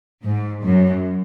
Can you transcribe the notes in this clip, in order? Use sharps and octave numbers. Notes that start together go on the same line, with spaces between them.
G#2
F#2